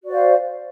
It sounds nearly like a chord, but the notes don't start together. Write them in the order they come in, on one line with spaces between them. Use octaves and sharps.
F#4 D5 C5 F5